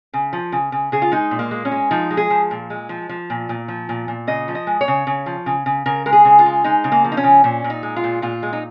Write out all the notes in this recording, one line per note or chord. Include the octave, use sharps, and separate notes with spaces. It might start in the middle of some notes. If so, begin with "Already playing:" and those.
C#3
F3
C#3
C#3
C#3 G#4
F4
G#3 D#4
A#2
A#3
G#3
C#4
G#3
F3 D#4
G#3
G#4
F3
A#2
G#3
F3
F3
A#2
A#2
F3
A#2
A#2
C#3 D#5
F3
D#5
G#3
C#5
C#3
C#3
F3
C#3
C#3
C#3 A#4
G#3 A#4
G#4
C#3
F4
G#3
G#3 D#4
C#3
A#3
F3
D#4
C#4
C#3
A#2 C#4
A#2
D#4
G#3
F4
A#2
A#2 F4
G#3
D#4